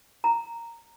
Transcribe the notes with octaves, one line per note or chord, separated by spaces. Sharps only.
A#5